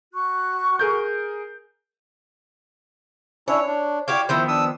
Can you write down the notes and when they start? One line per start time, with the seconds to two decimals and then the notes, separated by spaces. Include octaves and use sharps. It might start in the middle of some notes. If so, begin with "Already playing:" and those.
0.14 F#4 C#6 F#6
0.79 G#4 A#4 G6
3.48 C#4 D4 E4 C#5
3.67 D4
4.08 E4 F#4 G4 C#5 F5 D6
4.29 D#3 F3 B3 E4 C5
4.48 D4 D#6 E6